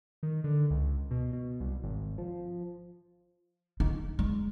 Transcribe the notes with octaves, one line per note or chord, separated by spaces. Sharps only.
D#3
D3
C#2
B2
B2
C2
G#1
F3
D#4
G#3